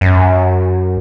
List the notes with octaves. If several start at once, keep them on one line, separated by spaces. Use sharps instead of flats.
F#2